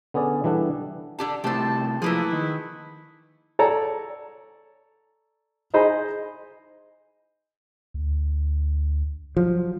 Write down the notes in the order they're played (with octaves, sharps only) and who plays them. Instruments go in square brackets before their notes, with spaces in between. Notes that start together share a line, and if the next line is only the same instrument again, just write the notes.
[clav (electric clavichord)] D3 B3 C#4 G#4 D5
E3 G3 D4 A4 F#5
[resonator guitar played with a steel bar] D3 G4 A5
[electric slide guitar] A2 C3 [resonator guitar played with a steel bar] G4 C5 [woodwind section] A5
[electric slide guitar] F3 [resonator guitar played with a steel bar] A3 A#3 G#4 [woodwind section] E4 B4
[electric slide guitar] D#3
[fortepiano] A4 C#5 D5 A5 A#5
D#4 G#4 C5 D#5 B5
[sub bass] D2
[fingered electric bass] F3 [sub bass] F#3